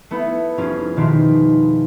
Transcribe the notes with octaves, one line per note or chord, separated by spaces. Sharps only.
A3 B3 E4
F1 G3 C#4 F4 G#4
B2 D#3 F3 C6 B6